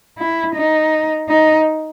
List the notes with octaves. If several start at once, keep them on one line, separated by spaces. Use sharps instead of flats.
E4
D#4
D#4